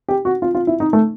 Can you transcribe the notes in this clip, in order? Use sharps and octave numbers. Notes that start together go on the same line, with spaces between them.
G4
F#4
F4
F4
E4
D#4
A3